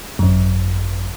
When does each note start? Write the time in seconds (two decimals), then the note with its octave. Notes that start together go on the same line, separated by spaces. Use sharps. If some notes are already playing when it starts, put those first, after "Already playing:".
0.19 G#1 F#2